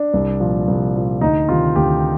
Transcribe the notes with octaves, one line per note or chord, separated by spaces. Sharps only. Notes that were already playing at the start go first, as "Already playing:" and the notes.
Already playing: D4
C2
A#2 F3
C2
A#2 F3
D2 D#4
C3 D#3 F4
D2 G4